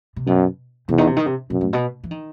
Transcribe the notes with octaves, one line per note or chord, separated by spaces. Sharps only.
C3
F#2 B2
E2 C3
D#3
C3
D#3
C3
F#2 B2
A2
B2
E3
D#3